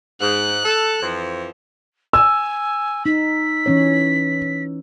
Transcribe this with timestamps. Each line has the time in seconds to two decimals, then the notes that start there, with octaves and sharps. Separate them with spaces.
0.21 G#2 F#6
0.65 A4
1.03 F2 E3 F3
2.13 G#5 E6
3.06 D#4 B6
3.66 E3 C#4 C#5